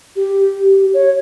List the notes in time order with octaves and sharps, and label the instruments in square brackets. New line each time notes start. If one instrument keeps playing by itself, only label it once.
[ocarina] G4
C#5